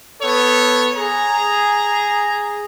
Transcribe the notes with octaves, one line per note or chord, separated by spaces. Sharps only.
B3 A4 C#5
G#4 A#5